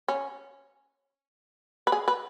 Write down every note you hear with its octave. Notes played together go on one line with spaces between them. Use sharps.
C#4
B4
G#4
B4